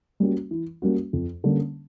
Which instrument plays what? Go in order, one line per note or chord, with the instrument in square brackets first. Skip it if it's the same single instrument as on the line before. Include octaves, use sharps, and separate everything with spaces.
[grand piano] G3 A#3 C#4 F#4
E3
G3 A#3 C#4 F#4
F2
D3 G3 A#3 C#4